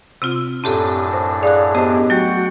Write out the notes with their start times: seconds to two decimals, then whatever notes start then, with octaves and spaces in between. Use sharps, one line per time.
0.22 C3 C4 F4
0.64 F#2 A2 C4 D4 G4 A4
1.13 C5
1.43 G#4 D5 F5 F#6
1.75 B3 G4 G#4 C5 D#5 A5
2.10 F#3 A3 F#4 F#5 G5